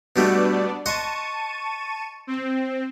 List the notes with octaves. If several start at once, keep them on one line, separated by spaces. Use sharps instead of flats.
B2 G3 A3 B3 D4 D5
D#5 F#5 A5 C6 C#6 D#7
C4